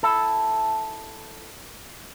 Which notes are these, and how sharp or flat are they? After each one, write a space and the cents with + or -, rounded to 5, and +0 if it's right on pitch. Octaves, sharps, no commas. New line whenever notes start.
E4 +0 A4 +0